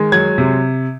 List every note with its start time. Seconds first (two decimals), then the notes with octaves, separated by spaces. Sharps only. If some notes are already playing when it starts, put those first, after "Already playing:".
Already playing: D#3 G#3
0.12 F#3 G#6
0.38 C3